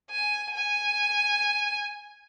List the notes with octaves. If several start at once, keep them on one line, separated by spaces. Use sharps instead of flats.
G#5
G#5